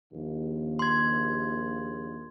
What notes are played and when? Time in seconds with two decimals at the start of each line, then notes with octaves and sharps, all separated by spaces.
0.13 A#1 D#2
0.79 C6 G#6